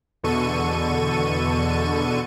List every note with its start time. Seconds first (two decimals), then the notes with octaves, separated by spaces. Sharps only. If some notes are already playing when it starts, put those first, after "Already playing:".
0.23 E2 B2 D3 A4 C#6 D#7